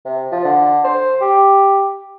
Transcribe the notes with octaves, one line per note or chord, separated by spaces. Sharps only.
C3
F3
D3
C5
G4